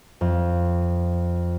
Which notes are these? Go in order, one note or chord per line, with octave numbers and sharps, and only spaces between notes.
F2